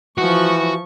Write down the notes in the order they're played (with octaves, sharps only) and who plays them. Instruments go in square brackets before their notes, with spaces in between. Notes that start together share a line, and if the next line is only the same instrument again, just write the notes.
[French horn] E3 [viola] F3 C#6 [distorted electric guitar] F#4